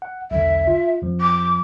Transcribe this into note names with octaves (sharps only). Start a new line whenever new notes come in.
F#5
B1 E2 D3 E5
F4
F2 F3
D6